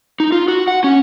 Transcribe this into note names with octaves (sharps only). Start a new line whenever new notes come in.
D#4
F4
F#4
F#5
C#4